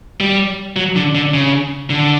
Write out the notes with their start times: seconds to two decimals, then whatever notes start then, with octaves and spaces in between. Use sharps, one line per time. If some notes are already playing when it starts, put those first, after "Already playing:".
0.20 G3
0.76 F#3
0.96 D3
1.15 D3
1.34 C#3
1.90 D3